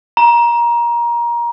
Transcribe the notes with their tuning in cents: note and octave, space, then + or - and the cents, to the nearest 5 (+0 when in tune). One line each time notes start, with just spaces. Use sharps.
A#5 +20